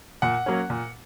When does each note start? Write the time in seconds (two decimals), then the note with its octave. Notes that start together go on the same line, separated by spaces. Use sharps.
0.22 A#2 F#5
0.46 F#3 A#3 C#4
0.70 A#2